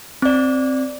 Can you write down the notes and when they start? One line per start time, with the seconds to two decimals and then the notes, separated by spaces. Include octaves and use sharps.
0.22 C4 D5